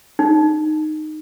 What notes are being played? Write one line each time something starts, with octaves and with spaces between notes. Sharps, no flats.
D#4